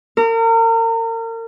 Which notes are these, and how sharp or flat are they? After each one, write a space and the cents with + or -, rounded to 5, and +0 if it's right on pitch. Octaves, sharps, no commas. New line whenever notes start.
A#4 -35